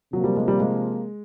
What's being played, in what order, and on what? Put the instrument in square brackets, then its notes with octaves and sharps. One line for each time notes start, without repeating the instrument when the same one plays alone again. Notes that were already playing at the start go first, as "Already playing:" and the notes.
[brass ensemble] C3 F3 A#3 [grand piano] F#3
[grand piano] G3
G#3
G3
G#3